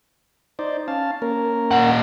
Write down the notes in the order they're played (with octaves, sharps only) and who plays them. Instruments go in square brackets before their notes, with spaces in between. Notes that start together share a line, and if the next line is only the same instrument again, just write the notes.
[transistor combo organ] D#4 C5 D5
C#4 F5 A5
A#3 C#4 A#4
[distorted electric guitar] A#2 F#5